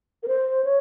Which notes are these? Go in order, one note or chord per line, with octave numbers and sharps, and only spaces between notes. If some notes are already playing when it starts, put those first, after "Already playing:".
A#4
C5
C#5